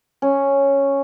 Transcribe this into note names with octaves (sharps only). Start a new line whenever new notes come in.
C#4